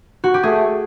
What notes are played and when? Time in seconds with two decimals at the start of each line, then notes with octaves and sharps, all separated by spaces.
0.24 F#4
0.34 G4
0.43 A3 G#4